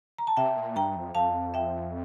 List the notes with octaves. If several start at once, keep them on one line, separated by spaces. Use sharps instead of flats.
A#5
A5
C3 E5 G5
A#2
G2 G5 A#5
F2
F2 F5 A5
E5 G5